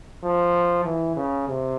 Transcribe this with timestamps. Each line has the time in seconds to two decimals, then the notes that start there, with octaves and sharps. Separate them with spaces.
0.23 F3
0.85 E3
1.17 C#3
1.48 C3